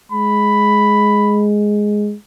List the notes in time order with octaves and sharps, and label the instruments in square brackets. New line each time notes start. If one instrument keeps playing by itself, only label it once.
[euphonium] G#3 [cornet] B5